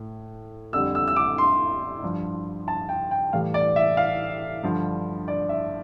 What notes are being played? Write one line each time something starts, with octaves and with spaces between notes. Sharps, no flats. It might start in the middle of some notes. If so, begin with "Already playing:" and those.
Already playing: A2
F2 D3 G3 E6
E6
E6
D6
C6
G2 F3
A5
G5
G5
A2 E3 G3 F5
D5
E5
F5
G2 D3 F3
D5
E5